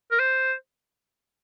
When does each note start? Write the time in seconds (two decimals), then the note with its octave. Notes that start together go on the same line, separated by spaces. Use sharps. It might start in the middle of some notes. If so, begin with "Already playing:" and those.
0.12 A#4
0.19 C5